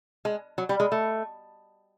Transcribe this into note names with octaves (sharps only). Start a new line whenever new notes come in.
G#3
F#3
G3
G#3
A3